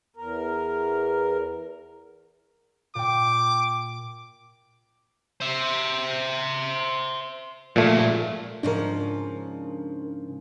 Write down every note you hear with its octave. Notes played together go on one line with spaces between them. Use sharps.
E2 A#4
A#2 G5 D6
C5 E5
A#2 F3 G#3 A3
G#2 C#3 F3 D4 A#4